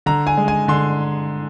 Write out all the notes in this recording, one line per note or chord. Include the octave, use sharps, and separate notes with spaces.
D3 A#5
G#5
G#3
G#5
D3 C6